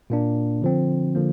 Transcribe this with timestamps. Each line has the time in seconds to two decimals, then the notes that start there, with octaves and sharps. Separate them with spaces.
0.10 A#2 A#3 D4
0.62 D3 F3 C4
1.15 D3 F3 A#3